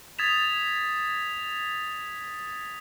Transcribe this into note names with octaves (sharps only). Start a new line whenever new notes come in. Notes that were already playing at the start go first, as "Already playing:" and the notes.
D#6 G#6 A6 B6 E7 F7